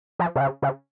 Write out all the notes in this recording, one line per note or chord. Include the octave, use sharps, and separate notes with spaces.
F3
C3
C#3
C#3